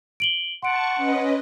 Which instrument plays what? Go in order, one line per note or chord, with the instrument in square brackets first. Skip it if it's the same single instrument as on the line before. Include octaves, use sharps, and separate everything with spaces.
[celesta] D7 F#7 G7
[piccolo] F#5 [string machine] A5 C#6 [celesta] C6 D7
[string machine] C#4 B4 D#5